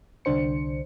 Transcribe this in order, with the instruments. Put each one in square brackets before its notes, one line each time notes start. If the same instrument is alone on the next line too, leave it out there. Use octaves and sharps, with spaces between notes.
[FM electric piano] C2 D3 D4 C5 C#7